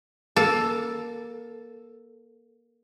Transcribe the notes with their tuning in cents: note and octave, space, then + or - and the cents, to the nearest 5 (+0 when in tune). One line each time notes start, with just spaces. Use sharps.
A#3 +20 A4 +0